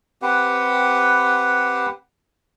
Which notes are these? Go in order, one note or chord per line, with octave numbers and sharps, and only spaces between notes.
C4 G4 B4 F#5